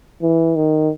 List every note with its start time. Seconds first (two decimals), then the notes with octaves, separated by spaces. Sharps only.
0.22 E3
0.56 D#3